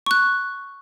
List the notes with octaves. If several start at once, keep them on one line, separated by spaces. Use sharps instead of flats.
C#6 F#6